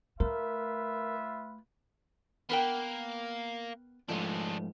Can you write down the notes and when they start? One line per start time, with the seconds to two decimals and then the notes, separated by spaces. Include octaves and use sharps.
0.20 A3 F4 A#4 B4 E5
2.50 A#3 B3 A#4 G5
4.09 G#2 F3 G#3 A3 D4